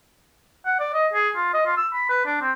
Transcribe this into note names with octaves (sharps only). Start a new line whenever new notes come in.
F#5
D5
D#5
G#4
F4
D#5
F4
E6
B5
B4
D4
C4